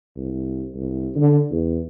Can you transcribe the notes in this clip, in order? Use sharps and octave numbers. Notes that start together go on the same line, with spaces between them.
C2
C2
D3
E2